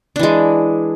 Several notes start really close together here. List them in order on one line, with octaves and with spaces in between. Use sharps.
D4 E3 G#3